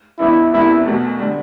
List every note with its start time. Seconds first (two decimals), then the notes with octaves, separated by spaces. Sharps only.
0.19 A1 G2 E3 B3 E4
0.53 F#1 E2 C3 G3 B3 E4
0.86 B1 B2 A3
1.19 D3 G3